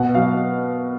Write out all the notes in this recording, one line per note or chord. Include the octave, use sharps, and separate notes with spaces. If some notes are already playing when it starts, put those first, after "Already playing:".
Already playing: B2 F#5
F#3 F5